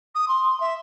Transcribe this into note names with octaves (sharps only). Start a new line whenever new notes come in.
D#6
C6
E5